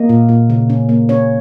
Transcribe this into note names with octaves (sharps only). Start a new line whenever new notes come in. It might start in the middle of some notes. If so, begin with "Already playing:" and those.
Already playing: A#3 D#5
A#2
A#2
C#3
C#4
A#3
C#4 C#5